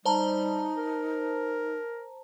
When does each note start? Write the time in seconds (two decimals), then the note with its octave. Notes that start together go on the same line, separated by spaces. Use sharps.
0.06 G3 D#4 C5 A5 A#5
0.77 A#4